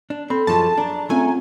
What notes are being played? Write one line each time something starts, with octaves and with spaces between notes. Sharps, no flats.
D4
C4 A4 B5
F#2 F3 G#4 A5
D4 A#5
A3 C4 C#4 F4 G#5